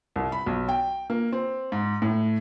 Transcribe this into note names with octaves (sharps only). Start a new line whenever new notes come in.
C2
B5
B1
G5
A#3
C4
G#2
A2